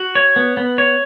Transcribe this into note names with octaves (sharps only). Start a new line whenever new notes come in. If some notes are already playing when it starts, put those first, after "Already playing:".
Already playing: F#4
C#5
B3
B3
C#5